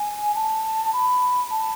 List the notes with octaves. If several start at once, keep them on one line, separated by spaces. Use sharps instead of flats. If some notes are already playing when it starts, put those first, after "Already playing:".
Already playing: G#5
A5
B5
A5